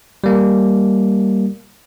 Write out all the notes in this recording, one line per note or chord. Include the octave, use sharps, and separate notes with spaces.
G3 A#3